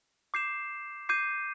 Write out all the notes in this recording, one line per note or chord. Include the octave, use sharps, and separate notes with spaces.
D6 G6 C7 E7
D6 G6 C7 D#7